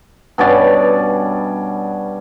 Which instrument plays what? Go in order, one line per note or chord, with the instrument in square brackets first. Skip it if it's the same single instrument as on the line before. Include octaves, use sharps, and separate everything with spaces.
[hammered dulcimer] G2 B2 C#4 D5